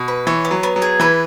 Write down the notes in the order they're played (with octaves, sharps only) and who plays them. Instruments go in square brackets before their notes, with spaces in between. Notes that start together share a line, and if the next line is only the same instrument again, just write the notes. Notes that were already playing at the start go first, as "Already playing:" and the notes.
Already playing: [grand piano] B2
[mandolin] B4
[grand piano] E3 [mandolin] C#5
[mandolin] B3
[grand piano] F#3
[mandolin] B3
[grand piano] F#3
[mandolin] G#4
[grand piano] E3 [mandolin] B4